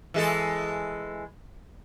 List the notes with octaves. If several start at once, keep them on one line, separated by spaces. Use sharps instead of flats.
E3 G#3 A4